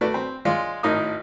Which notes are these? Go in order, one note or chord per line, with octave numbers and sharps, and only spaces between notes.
A3 F#4 A4 B4 D5
C4
G#3 F4 C#5 D5 F5
G#1 A2 D#4 A#4 D#6